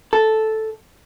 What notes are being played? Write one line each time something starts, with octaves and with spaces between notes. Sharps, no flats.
A4